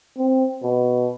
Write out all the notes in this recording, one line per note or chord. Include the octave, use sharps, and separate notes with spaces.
C4
B2